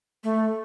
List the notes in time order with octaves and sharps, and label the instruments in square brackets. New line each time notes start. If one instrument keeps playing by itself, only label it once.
[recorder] A3